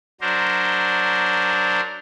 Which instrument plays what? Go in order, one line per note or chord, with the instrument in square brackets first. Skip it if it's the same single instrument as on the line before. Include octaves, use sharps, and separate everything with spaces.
[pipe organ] F#3 D4 A#4 C5